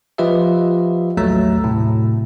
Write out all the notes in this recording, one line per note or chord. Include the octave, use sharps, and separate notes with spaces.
F3 F4 G4 B4 D#5 E5
A1 D#2 F#3 A3 A#5 E6
A2 C3